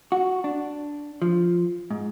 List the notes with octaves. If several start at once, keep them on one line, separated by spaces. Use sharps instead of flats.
F#4
D4
F3
G#2